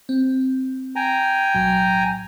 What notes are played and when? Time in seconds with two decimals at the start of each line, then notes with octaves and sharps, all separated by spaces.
0.09 C4
0.96 G5 G#5 A#5
1.54 B1 A2 F#3